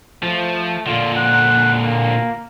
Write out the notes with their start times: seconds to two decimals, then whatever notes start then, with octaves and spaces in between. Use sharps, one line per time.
0.23 F3 A3
0.86 A#2 D3 F4
1.17 F#5
1.82 A#3